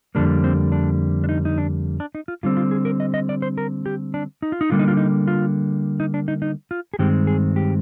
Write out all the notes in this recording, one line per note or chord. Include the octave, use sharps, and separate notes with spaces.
F2 D3 G3 A#3 D4
C4
D4
D4
D#4
D#4
D4
D4
D#4
F4
D3 G3 C4 F4
F4
G#4
A#4
D#5
D#5
D5
C5
A#4
G4
D4
D#4
F4
D#4
D3 G3 A#3 F4
D#4
F4
D#4
F4
D#4
D4
D#4
D#4
F4
G#4
G2 D#3 G#3 C4 G4
G#4
G4